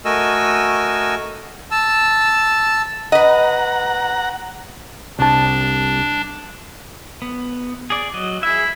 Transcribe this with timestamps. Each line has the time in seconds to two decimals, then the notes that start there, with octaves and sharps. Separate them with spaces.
0.05 A3 F#4 A#4 D#5 G#5 E6
1.71 A5 E6
3.12 B4 D#5 F#5 A#5
5.19 C2 D4 A5
7.22 B3
7.90 G#4 D5
8.14 F#3 D#5
8.43 E4 G#4 E5